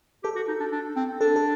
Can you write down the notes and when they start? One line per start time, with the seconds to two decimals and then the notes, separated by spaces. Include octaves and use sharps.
0.24 G4 A4
0.36 F#4
0.48 D#4
0.60 D4
0.72 D4
0.96 C4
1.20 D4 A4
1.36 A4